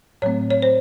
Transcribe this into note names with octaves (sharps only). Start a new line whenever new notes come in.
A2 F#3 A3 C4 C#5
C#5
C5